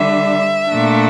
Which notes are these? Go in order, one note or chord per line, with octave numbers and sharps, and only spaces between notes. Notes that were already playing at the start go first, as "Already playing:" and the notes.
Already playing: D3 G3 D4 E5
A#2 A3 D4